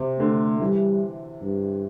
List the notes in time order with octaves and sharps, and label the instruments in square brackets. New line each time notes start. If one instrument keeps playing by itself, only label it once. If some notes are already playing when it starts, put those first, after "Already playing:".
Already playing: [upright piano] C3
[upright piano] D3 [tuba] A3
[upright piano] E3 [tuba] G3
[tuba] G2